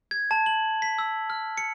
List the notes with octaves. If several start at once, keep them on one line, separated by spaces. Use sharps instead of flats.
G#6
A5
F#7
B6
E6
F6
C#7